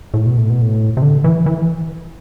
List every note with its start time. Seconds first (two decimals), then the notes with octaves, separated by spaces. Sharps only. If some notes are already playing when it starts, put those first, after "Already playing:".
0.14 A2
0.26 B2
0.38 A2
0.50 B2
0.62 A2
0.97 C3
1.02 D3
1.24 E3
1.46 E3